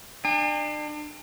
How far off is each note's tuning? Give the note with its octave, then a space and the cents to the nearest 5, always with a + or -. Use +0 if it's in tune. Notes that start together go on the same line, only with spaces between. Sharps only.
D4 +35 G#5 -45